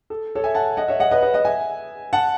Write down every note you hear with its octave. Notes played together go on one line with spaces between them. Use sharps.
A4
A4 C#5
E5 G#5
F#5 A5
D#5 F#5
C#5 E5
D#5 F#5
B4 D#5
B4 D#5
D#5 F#5
E5 G#5
F#5 A5